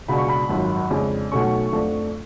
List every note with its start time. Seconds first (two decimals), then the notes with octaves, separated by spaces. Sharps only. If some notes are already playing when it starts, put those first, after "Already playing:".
0.08 C#2 B2 G#3 D4 B5
0.18 C#6
0.28 B5
0.49 G#1 F#2 F3
0.91 F2 C#3 G#3 D4
1.32 B1 B2 A3 C#4 C#6
1.72 F2 F3 A3 D4